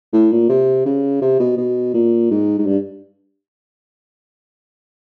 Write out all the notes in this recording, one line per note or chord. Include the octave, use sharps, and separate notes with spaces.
A2
A#2
C3
C#3
C3
B2
B2
A#2
G#2
G#2
G2